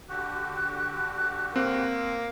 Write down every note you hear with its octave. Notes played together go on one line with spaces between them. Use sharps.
D3 F#4 G4 F#6
A#3 C4